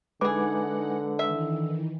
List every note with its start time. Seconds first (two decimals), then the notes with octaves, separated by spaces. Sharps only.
0.21 D3 E3 G#3 D#4 G#4 B4 F#5 D6
1.19 D#3 E3 E5